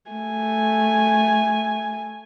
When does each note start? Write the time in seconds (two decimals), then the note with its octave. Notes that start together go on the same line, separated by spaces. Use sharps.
0.11 A3 G#5